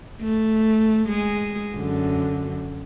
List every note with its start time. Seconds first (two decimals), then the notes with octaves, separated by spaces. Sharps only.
0.21 A3
1.08 G#3 G#4
1.75 F#2 D3